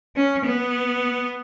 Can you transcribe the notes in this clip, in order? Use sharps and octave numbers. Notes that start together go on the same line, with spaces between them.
C#4
B3